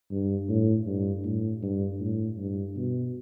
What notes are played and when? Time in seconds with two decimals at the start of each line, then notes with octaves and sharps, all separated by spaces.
0.11 G2
0.49 A2
0.86 G2
1.25 A2
1.62 G2
2.00 A2
2.38 G2
2.76 B2